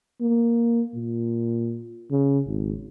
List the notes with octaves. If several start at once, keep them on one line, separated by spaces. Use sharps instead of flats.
A#3
A#2
C#3
G#1